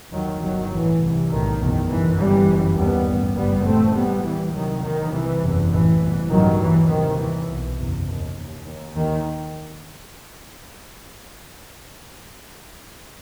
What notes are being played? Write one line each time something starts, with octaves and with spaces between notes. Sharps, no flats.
D#2 D#3 F#3
G1 G2 D#3 F#3
A1 A2 E3
C2
C3
B1 A2 D#3
F#1 E2 B2
G1 F#2 E3
G1 F#2 E3 G3
G1 F#2
D#2 G3 B3
A1 G2
F#1 F#2 G3 B3
A1 A2 A3 C4
D#2 G3 B3
D#2 E3 G3
C2 C3 D#3 F#3
D#2 D#3
C2 C3 E3
F#1 E2 C3
A1 A2 E3
C2 B2
A1 G2 D#3 F#3
D#2 E3
C2 C3 D#3
D#2 E3
B1 B2
F#1 E2 C3
D#2
D#2
D#2
D#2 D#3